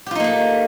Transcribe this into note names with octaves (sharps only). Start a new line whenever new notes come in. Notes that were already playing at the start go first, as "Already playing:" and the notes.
A3 A#3 D#4 F4 G4